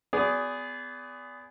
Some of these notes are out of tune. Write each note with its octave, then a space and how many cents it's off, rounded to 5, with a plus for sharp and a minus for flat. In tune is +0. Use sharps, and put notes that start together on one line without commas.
B3 +25 G#4 -5 D5 -25